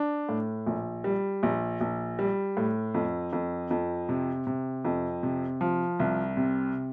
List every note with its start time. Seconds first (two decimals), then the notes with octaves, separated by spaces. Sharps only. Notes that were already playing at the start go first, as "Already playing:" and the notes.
Already playing: D4
0.29 A2
0.67 A#1
1.04 G3
1.43 A#1
1.81 A#1
2.19 G3
2.57 A2
2.94 F2
3.33 F2
3.71 F2
4.09 C3
4.47 C3
4.85 F2
5.23 C3
5.61 F3
6.00 C2
6.37 C3